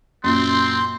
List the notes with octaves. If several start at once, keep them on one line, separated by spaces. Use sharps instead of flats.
F#2 A#2 C4 C6